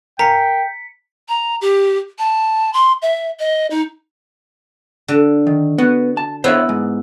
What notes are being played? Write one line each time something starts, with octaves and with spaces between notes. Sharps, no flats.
A#4 F5 G5 G#5 A#5 B6 C#7
A#5
G4
A5
C6
E5
D#5
D#4
D3
D#3
B3 F#4
A5
B3 E4 C5 C#5 E5
G#2